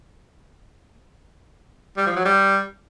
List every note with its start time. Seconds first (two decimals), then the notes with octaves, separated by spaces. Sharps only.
1.97 G3
2.06 F3
2.16 F#3
2.25 G3